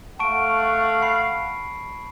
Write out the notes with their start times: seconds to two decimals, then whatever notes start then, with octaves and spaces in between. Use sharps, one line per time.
0.19 A3 F5 F#5 A5 C#6 D7
1.02 B5 C7